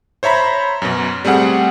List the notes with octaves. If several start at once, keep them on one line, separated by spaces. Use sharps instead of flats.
C5 C#5 E5 A#5 B5
F#2 B2
G3 A3 C4 G#4 F#5